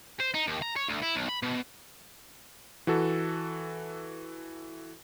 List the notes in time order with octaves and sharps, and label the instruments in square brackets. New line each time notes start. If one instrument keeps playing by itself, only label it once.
[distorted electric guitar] C5
D#4
D#2
A#5
C#5
D2
E4
B1
B5
B2
[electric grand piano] E3 F#4 A4